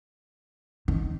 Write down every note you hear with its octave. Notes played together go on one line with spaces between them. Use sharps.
D#3